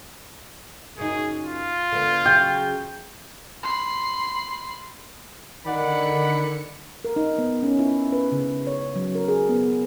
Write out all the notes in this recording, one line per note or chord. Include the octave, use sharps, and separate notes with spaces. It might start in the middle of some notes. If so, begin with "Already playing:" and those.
F#2 C#3 D#4 G#4
F4
D3 B3
C#3 F#3 G5
B5 C6
D3 D#3 D5 F#5 B5 C#7
A#4
D#4
B3
C#4
E4
B4
C#3
C#5
F#3
A#4
G#4
B3